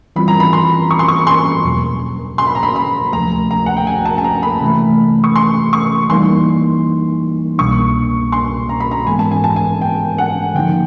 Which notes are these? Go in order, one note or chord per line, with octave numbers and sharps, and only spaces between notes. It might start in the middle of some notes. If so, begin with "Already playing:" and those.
E3 G3 C4 F4 B5
A#5
B5
C6
C#6
C6
C#6
C6
E2 B2 F#3
C6
B5
A#5
B5
B5
D2 C3 F3 A3 A#5
A#5
F#5
G5
G#5
A5
A5
A#5
B5
C3 E3 A3
C#6
C6
C#6
E3 G3 A#3 D#4 C6
C2 B2 G3 A#3 D4 C#6
C6
A#5
B5
A#5
G#2 E3 G#3 B3 G#5
A5
G#5
A5
G#5
G5
F#5
D3 F3 A#3 D#4 G5